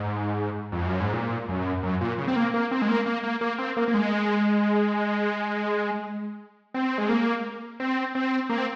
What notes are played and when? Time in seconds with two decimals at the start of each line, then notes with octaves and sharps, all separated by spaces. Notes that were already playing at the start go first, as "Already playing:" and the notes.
Already playing: G#2
0.72 F2
0.86 F#2
1.00 G#2
1.13 A#2
1.49 F#2
1.83 F#2
2.01 A#2
2.18 C#3
2.28 C4
2.36 A#3
2.54 A#3
2.71 C4
2.82 G#3
2.89 A#3
3.06 A#3
3.23 A#3
3.41 A#3
3.58 C4
3.77 A#3
3.88 A#3
3.94 G#3
6.74 C4
6.98 G#3
7.09 A#3
7.80 C4
8.15 C4
8.50 A#3
8.58 C4